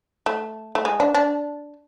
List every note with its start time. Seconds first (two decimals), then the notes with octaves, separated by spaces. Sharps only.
0.26 A3
0.75 A3
0.85 G#3
1.00 D4
1.14 D4